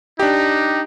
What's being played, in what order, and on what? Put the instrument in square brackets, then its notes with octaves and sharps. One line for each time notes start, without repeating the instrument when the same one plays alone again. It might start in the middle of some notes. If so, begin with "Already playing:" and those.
[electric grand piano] D4 G4 [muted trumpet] D#4